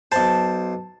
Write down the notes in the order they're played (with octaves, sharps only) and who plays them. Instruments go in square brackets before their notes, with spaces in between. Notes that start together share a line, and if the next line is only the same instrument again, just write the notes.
[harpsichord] B1 C5 [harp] A5